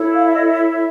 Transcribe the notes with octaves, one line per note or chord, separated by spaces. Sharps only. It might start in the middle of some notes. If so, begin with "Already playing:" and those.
Already playing: E4 A4 C#5
F5
E5
D#5
E5